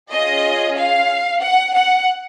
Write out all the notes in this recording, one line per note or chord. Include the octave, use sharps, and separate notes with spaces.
C#4 F4 G#4 D#5
F5
F#5
F#5